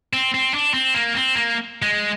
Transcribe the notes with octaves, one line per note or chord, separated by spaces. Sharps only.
C4
C4
D4
C4
A#3
C4
A#3
G#3